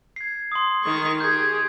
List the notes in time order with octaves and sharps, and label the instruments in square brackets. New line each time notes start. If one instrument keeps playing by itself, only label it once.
[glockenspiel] G#6 C7
C6 D#6
[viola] D#3 C#6
[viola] G4 G#4 [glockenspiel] G6 G#6